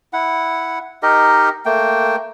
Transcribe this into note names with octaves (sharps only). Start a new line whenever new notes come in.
E4 F#5
D#4 G4 A#4 D#5
A3 A#3 G5